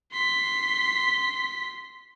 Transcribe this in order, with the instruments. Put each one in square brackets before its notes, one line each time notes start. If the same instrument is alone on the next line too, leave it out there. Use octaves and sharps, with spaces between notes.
[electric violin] C6 B6